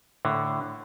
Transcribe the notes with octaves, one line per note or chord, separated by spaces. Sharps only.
A2 D3